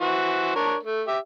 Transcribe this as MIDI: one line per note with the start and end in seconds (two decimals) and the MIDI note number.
0.01 0.52 52
0.01 0.52 66
0.01 0.52 72
0.55 0.75 62
0.55 0.75 70
0.55 0.75 73
0.83 1.03 57
1.08 1.18 67
1.08 1.18 76